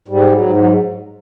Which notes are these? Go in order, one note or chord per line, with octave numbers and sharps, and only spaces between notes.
G#2 G3
F#3
G#2
F#3